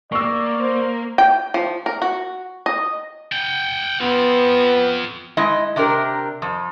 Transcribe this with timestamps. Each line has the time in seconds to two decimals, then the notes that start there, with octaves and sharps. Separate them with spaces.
0.12 A#3 D5 C#6 E6
0.60 C5
1.18 G5
1.54 F3
1.86 A#4
2.02 F#4
2.66 D#5
3.32 F#5 G5
4.01 B3 C4 F4
5.37 G#3 E4 D#5
5.76 C3 D4 G4 A#4
6.42 F2